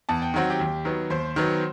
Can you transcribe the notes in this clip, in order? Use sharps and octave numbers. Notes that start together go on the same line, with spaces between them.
E2 A5
G5
D#3 F#3 C4 F#5
G4 G5
D#2
D#3 F#3 B3
D#2 C5 C6
D#3 F#3 B3